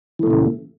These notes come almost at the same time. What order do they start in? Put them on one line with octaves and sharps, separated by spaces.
E3 A3 A#2 C#3